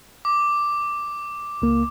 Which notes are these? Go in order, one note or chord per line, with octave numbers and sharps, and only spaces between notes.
D6
C#2 A#3